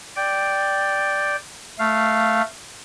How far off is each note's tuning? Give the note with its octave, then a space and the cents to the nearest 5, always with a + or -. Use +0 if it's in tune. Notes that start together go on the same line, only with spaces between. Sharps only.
D5 +0 G5 +0
A3 +0 F5 -10